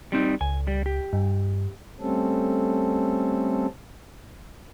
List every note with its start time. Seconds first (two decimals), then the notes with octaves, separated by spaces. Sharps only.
0.12 G3 C4 D#4
0.41 C#2 G#5
0.67 G3
0.86 G4
1.13 G2
2.00 G3 A3 C4 C#4 A4